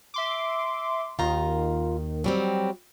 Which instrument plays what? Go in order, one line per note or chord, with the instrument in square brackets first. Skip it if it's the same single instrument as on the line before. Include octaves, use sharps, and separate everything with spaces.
[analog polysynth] E5 C6 D6
[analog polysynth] D#2 D#3 [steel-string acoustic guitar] F4 A#5
[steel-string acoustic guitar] F#3 G3 C4